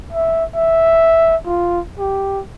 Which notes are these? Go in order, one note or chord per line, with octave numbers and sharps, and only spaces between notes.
E5
E5
F4
G4